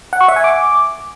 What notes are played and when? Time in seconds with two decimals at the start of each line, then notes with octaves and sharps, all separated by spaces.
0.13 F#5
0.21 C#6
0.28 E5
0.36 G#5
0.44 D6